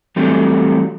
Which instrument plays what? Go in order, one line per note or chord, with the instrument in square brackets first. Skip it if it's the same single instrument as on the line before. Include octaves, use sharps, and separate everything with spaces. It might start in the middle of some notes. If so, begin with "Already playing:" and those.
[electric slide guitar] E3 F#3 G3 A3 C4 D#4